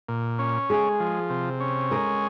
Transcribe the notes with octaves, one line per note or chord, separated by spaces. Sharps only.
A#2
C#4
G#3 G#4
F3
C3
C#4
G#3 A#4